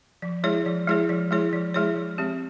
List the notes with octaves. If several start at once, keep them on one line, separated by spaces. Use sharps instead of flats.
F3
G#3 E4 G#4 C#5
F3
G#3 E4 G#4 C#5
F3
G#3 E4 G#4 C#5
F3
G#3 E4 G#4 C#5
F3
G#3 C4 G4